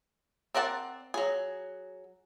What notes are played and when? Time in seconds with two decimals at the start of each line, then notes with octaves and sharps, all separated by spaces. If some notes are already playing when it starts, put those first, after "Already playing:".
0.55 C4 A#4 D5 F#5 A5
1.14 F#3 G#4